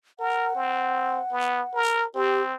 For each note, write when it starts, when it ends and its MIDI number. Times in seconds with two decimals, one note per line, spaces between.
0.19 0.52 70
0.19 1.81 78
0.55 1.20 60
1.32 1.62 59
1.75 2.05 70
2.15 2.55 60
2.15 2.42 67